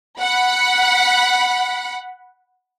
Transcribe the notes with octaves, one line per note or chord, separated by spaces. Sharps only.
F#5 B5